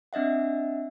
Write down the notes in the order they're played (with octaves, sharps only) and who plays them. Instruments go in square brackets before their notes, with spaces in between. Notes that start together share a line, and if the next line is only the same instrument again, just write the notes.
[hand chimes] C4 D4 D#5 E5 F#5